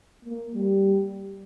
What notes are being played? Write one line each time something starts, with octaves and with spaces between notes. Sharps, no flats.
A#3
G3